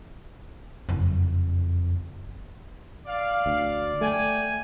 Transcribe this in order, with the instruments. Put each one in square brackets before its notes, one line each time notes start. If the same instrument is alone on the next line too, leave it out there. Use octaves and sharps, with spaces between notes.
[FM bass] F#1 [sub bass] F2
[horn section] D5 [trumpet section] F5
[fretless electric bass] D2
[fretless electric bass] A3 [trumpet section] G5 G#5